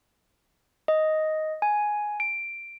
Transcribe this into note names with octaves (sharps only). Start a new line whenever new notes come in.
D#5
G#5
D7